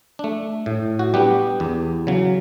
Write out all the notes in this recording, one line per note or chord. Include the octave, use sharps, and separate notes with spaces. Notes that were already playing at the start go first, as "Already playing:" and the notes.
A3 D4
A2
F#4
G3 B3 D4 G4
E2
C#3 F#3